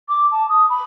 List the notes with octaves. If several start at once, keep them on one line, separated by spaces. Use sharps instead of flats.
D6
A5
D#6
B5